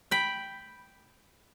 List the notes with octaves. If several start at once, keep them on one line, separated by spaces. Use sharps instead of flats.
G5 B5